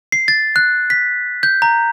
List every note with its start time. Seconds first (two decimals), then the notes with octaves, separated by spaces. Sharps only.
0.12 C7
0.28 A6
0.56 F#6
0.90 B6
1.43 G6
1.62 A#5